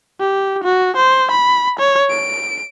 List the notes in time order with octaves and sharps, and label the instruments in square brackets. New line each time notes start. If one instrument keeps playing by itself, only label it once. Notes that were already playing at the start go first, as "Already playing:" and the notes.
[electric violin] G4
F#4
C5
B5
C#5
D7